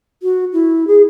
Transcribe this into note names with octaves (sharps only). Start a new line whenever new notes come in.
F#4
E4
G#4